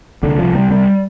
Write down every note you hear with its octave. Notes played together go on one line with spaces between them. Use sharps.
C2 D3
C2 F3
C2 G3
C2 G3